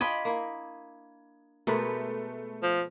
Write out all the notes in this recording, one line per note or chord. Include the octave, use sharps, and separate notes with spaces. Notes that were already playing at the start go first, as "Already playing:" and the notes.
D4 F4 D#5 G5 B5 G#6
A#3 E4
B2 G#3 A3 A#4 B4
F3